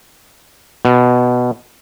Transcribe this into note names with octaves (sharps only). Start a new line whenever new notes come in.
B2